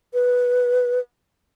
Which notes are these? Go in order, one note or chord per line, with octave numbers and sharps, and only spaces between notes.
B4